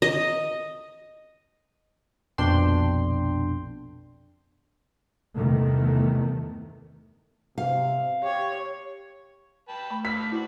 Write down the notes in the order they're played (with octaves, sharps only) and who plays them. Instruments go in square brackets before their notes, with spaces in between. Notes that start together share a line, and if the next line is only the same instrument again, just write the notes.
[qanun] D#5
[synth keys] A#1 F2 B2 D4 G5 C6
[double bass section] E2 G2 C3 D#3 A3
[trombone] C3 [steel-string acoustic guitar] F5
[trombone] G4 [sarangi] C#5
[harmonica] B4 G5 A5
[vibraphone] A3 [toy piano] B5
[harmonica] A#3 D#4 B4 [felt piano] B6
[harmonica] C4 F#4 D5 [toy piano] E4